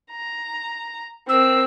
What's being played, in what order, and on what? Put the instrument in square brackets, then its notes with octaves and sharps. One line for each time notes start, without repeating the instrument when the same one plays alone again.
[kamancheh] A#5
[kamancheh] C4 A#4 [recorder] E6